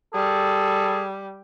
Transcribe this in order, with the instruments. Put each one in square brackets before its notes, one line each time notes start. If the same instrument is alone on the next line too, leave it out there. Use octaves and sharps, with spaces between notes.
[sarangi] G3 [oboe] G#4 [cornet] A4